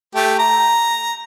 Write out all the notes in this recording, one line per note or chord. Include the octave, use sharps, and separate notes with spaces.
A3 G4
A#5